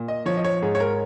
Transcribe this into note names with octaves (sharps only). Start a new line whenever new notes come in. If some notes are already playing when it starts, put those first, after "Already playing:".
Already playing: A#2
D#5
F3 C#5
D#5
C#5
G#2 G#4
C#5
A#4